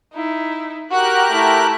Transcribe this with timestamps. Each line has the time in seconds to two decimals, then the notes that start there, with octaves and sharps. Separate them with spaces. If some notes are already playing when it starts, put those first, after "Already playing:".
0.14 D#4 E4
0.91 F#4 G4 A#4 F#6
1.30 A3 E4